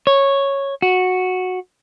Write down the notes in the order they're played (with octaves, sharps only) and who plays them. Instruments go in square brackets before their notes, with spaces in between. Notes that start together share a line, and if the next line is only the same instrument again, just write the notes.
[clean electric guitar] C#5
F#4